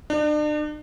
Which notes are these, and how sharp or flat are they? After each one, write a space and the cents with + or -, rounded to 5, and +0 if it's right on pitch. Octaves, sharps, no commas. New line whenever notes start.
D4 +40